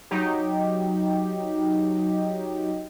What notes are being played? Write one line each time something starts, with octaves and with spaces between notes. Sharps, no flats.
F#3 D#4 G4